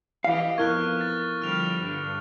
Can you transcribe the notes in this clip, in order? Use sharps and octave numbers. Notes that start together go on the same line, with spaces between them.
E3 G4 D#5 F5
F2 B3 E4 A#4 C#6 F6 F#6 G#6
A6
D3 F3 G3 F6 F7
G2 D3